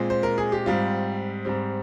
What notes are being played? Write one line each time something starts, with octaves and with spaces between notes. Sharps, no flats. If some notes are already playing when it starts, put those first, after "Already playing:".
Already playing: A#2 G#3 C4
C5
A#4
G#4
G4
G#2 G3 C4 F4
G#2 G3 C4